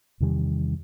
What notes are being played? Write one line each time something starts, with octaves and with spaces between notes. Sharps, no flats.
E2 C3 D#3 G3